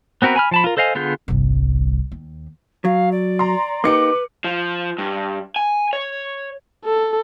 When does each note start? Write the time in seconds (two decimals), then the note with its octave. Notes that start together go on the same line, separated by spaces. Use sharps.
0.22 B3 C4 F#4 A#4 B4
0.36 G#5 B5 F6
0.51 F3 A5 B5
0.64 F4 A#4
0.77 A4 C5 D#5 F5 G#5
0.95 D3 B3 F4 G#4 G6
1.28 G1 C2
2.12 D#2
2.85 F#3 F5
3.12 D5
3.39 A#5 C6
3.84 A#3 D#4 G4 B4 D6 C#7
4.44 F3
4.98 G2
5.56 G#5
5.93 C#5
6.85 A4